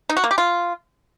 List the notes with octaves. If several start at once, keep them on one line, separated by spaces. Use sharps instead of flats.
D#4
F#4
A#3
G4
F4